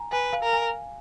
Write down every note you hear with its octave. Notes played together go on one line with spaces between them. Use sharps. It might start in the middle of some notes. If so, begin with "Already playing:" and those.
Already playing: G#5 A#5
B4 G#5
F5
A#4
G#5